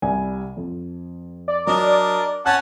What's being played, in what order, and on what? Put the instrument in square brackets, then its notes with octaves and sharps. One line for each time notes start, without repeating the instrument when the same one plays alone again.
[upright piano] C2 G3 G#5
F2
[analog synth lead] D5
[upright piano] F#3 [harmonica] D4 A#4 D#5
[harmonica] C#4 F#5 A5 [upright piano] F#6